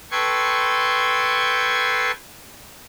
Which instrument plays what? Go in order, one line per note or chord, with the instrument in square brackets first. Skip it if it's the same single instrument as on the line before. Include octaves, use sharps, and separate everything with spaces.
[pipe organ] A4 B4 G5 C6 C#6 G#6